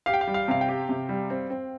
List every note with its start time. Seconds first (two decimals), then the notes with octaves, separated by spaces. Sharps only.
0.06 G4 F5
0.14 G5
0.21 F5
0.27 G3
0.34 F5
0.48 C3 F5
0.61 G5
0.68 G4
0.89 C3
1.09 G3
1.30 C4
1.50 C4